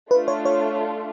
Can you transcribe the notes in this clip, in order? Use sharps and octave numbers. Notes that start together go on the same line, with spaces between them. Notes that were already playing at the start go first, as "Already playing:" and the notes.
A3 D4 F4 B4
C#5
C#5